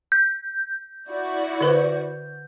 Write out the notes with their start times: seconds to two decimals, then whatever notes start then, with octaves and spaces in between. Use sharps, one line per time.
0.12 G6
1.10 E4 F#4 D5
1.61 D3 B4 C5